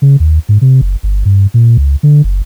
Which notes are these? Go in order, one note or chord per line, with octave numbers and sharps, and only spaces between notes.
C#3
D#2
G#2
C3
F#1
G1
G2
A#2
C#2
D3
F#1